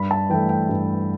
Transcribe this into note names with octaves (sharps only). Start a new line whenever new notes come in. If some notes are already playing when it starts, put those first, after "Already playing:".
Already playing: G2 B5
A5
E3 A3 G5
G5
G2